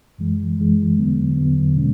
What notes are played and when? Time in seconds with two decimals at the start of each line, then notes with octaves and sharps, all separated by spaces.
0.18 F#2 E3 G#3
0.58 F#2 E3 G#3
0.97 E2 D3 F#3 B3
1.37 E2 D3 F#3 B3
1.76 B2 G#3 C#4